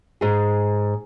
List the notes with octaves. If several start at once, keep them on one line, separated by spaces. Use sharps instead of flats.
G#2 G#4